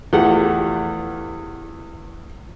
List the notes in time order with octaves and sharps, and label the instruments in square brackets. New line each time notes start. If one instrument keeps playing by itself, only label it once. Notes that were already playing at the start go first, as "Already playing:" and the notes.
[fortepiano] E2 F3 A3 G4 F#5